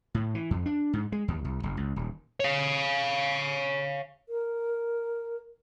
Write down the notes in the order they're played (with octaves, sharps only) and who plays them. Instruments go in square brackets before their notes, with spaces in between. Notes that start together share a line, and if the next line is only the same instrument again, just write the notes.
[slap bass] A2
E3
F2
D4
G#2
G#3
D#2
C2
F#1
C#2
D#1
[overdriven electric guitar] C#5 F5
[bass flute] A#4